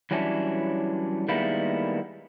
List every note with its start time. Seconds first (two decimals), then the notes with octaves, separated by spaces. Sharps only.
0.11 E3 F#3 G3 C#4 D4 E4
1.28 D#3 G3 G#3 A#3 B3 E4